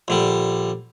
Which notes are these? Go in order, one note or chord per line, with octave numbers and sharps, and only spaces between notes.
A#1 D3 G3